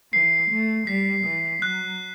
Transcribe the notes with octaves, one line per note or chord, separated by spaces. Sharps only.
E3 C7
A3
G3 B6
E3
F#3 F#6